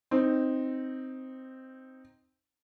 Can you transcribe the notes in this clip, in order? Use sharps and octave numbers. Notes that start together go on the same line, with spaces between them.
C4 D#4